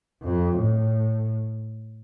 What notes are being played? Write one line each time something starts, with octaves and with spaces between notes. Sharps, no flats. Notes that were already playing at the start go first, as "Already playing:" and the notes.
F2
A2